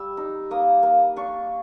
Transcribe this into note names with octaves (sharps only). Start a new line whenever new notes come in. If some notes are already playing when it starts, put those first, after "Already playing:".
Already playing: G3 E6
D#4
A#3 D#6
A#3
D4 C#6